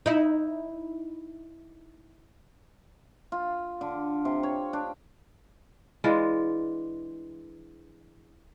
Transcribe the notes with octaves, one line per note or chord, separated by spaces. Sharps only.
D#4 E4
F4
D3
C3
C#5
D4
E3 G#3 D4 F4